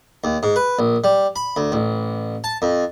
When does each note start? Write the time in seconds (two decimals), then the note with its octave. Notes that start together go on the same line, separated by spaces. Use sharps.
0.24 D#2
0.43 G#2
0.56 B4
0.79 A#1
1.04 G3
1.36 B5
1.56 D2
1.72 A1
2.44 A5
2.62 F2